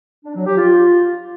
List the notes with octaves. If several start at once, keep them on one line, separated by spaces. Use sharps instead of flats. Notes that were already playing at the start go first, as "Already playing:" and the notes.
D4
F#3
G4
F4